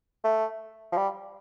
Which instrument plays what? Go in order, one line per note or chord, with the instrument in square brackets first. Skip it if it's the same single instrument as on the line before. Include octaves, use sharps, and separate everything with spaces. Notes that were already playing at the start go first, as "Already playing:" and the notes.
[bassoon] A3
F3
G3